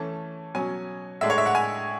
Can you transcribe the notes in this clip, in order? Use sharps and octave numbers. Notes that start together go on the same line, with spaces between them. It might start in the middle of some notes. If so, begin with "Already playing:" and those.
Already playing: E3 A3 C#4 A5
B2 F#3 C#4 G#5
A2 G#3 D4 E5
C#5
E5
F#5
G#5